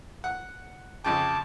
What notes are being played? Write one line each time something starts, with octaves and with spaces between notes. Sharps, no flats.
F#5
F2 C#3 G5 A5 D6